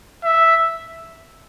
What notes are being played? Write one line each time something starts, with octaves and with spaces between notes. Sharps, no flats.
E5